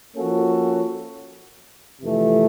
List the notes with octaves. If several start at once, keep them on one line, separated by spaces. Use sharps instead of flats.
F3 A#3 C#4 F#4 A4
F2 C3 E3 A3